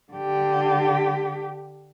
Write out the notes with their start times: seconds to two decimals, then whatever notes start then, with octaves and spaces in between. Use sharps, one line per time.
0.13 D3 G4